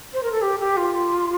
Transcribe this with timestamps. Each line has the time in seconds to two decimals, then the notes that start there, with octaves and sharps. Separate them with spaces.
0.13 C5
0.23 A#4
0.32 A4
0.41 G4
0.59 G4
0.76 F4